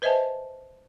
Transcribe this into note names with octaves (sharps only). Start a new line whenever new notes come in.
B4 C5 D#5 E5 G#5 A5